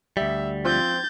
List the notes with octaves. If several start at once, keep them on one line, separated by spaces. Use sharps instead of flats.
D2 G3 E5
F3 C4 G6 A6